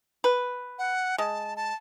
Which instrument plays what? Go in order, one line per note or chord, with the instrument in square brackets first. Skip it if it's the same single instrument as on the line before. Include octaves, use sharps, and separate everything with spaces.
[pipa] B4
[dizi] F#5
[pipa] G#3 [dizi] A5
[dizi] A5